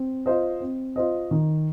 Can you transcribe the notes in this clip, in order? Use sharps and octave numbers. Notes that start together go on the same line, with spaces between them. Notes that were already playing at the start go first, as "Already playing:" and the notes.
Already playing: C4
F4 C5 D#5
C4
F4 C5 D#5
D#3